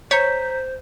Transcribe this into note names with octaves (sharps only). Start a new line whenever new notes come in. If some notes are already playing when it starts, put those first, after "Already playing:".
C5 C#5 A#5 G6 B6